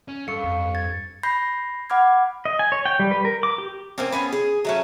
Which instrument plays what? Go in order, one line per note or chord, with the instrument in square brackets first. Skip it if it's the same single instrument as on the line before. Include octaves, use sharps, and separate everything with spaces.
[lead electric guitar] C#4
[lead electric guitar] G2 [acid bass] A4 [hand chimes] F5 C#6 [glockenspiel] C#7
[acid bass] F2
[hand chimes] G#6 [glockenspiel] A6
[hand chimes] B5 G6 A#6 C7
F#5 B5 D6 F6 G#6
[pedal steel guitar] D#5
G#5
C#5
G5
G3
B4
A#4
D6
G4
[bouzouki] A#3 C4 C#4
B3 C#4 G#4
G#4
F#3 A3 C#4